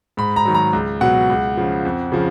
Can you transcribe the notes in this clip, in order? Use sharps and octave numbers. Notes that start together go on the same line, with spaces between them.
G#2 B5
A#5
D#3 F#3
A#5
C#2
B2 F#3 F#5
C#2
C#3 F3
F2
C#3 F3